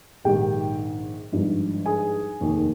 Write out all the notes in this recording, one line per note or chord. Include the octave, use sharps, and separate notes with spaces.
A#1 G#2 D#3 G4 G5
G#1 G2 F3
G#4 G#5
F1 D#2 D#3